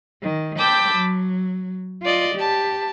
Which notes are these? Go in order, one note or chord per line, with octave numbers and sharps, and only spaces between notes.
D#3
G5 A5 B5 D6 E6 G6
F#3
F4 D5 D#5
G4 A5